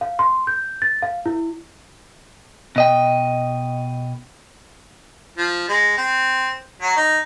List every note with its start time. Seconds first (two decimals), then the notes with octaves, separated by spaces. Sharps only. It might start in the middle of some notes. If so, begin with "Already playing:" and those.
0.01 F5
0.19 C6
0.47 G6
0.82 A6
1.02 F5
1.26 E4
2.76 B2 D#5 G5
5.38 F3
5.68 G#3
5.97 C4
6.82 F#3
6.97 D#4